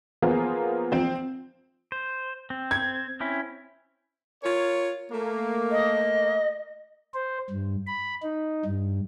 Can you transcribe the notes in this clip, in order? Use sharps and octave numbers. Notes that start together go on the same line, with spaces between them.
F3 A#3 B3 F4 G#4 C5
F3 C4 C5
C5
C4
G#6
C4 C#4 E4
F4 A#4 C#5
A3 A#3
D#5
C5
G2
B5
D#4
G2